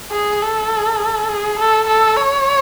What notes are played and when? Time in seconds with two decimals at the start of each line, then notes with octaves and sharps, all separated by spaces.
0.12 G#4
0.42 A4
1.29 G#4
1.59 A4
1.88 A4
2.17 C#5